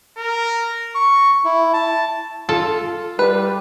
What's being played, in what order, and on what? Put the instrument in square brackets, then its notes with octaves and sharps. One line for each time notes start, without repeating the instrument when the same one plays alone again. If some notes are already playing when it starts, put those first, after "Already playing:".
[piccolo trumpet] A#4
[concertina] C#6
E4
A5
[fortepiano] F4 [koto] A4
[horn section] G3 [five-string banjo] B4